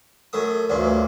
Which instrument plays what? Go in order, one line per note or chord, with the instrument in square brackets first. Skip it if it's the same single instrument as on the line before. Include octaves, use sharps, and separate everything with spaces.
[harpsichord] F#2 A3 D#6
[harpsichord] A1 G2 A#2 [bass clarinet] D2